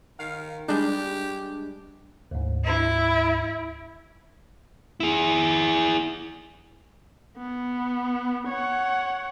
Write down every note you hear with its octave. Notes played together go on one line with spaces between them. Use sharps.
D#3 F5
G3 G#3 D4 G4
D2 G#2
E4
E4 G#4
B3
C#5 F#5